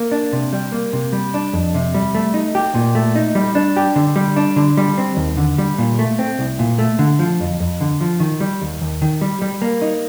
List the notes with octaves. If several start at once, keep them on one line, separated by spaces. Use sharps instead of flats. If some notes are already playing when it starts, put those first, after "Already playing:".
Already playing: A#3
D4
C3
G3
A#3
C3
G3
D4
F2
C3
G3
A3
D#4
G4
A#2
A3
D#4
G3
D4
G4
D3
G3
D4
D3
G3
C4
D#2
D3
G3
A#2
A3
C4
C2
A#2
A3
D3
F3
F2
F2
D3
F3
D#3
G3
D#2
D#2
D#3
G3
G3
A#3
D#4